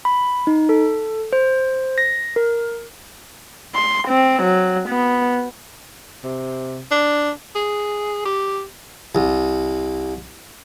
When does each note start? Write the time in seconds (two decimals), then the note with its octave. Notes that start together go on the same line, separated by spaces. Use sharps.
0.05 B5
0.47 D#4
0.69 A4
1.33 C5
1.98 A#6
2.36 A#4
3.75 C6
4.08 C4
4.43 F#3
4.89 B3
6.24 C3
6.91 D4
7.55 G#4
8.25 G4
9.15 C2